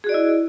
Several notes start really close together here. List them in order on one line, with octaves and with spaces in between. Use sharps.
G#4 F#4 D5 D#5 E4